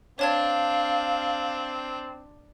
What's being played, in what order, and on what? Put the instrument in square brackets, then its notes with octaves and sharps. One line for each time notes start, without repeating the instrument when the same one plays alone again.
[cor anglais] C4 [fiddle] D4 [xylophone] C#5 A5 G#6 [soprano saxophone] F5